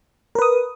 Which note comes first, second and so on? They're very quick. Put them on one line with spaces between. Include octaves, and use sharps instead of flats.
A#4 B4 D#6